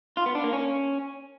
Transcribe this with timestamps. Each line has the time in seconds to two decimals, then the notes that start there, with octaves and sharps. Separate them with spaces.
0.17 F4
0.26 B3
0.35 D4
0.44 A#3
0.53 C#4